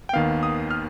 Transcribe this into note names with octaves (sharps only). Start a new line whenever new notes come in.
G5
D#2 D#3 B3 F5
D#6
F6